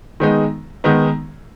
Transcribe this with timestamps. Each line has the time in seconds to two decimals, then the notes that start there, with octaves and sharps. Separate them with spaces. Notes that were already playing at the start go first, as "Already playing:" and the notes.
0.20 D#3 G#3 B3 D#4
0.84 D#3 G#3 B3 D#4